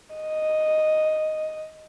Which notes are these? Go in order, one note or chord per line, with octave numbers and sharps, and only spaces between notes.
D#5